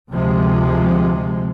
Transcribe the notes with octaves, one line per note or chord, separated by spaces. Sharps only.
D2 C3 F3 G#3